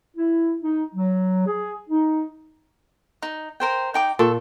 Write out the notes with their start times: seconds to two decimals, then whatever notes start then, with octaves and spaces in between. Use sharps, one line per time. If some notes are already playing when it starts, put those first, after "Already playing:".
0.16 E4
0.61 D#4
0.94 F#3
1.46 G#4
1.89 D#4
3.22 D#4
3.60 A#4 C5 G5
3.94 D#4 G5 D6
4.19 A#2 A4 C#6